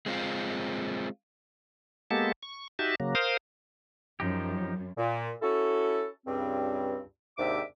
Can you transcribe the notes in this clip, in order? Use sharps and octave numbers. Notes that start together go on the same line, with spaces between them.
G#3 C4 F4
G#3 A#3 B3 G4 A4 A5
C#6
D#4 F#4 G4 E5 A5
C#3 F#3 A#3
A#4 C5 F5 D#6
F#2 F3 D#4 G4
A#2
C#4 E4 F#4 A4
C#2 G2 C4
D#2 G#2 C3 D4 E5 D6